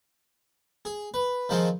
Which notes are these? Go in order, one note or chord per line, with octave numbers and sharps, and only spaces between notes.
G#4
B4
D#3 F3 G#3 C4 F4